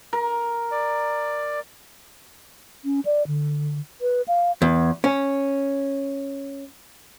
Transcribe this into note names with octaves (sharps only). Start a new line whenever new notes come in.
A#4
D5
C#4
D5
D3
B4
F5
E2
C#4